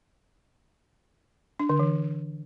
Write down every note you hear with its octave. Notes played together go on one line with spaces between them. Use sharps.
D4
D3
E3